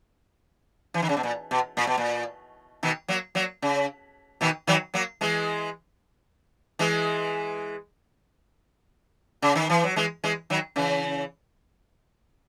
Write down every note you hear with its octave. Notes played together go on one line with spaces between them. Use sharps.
E3
D#3
C#3
B2
A#2
B2
A#2
B2
A#2
B2 D#3
F#3 A#3
F#3 A#3
C#3
B2 D#3
D#3 F#3
F#3 A#3
E3 G#3
E3 G#3
C#3
D#3
E3
F#3
E3 G#3
E3 G#3
D#3 F#3
C#3 E3